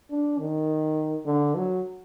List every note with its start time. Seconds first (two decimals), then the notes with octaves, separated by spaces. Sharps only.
0.11 D4
0.39 D#3
1.25 D3
1.55 F#3